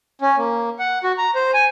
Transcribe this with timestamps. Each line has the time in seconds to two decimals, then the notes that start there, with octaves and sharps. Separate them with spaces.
0.21 C#4
0.38 A#3
0.79 F#5
1.04 F#4
1.18 A#5
1.35 C5
1.54 G#5